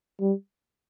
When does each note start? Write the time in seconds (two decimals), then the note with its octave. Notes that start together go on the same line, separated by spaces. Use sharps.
0.21 G3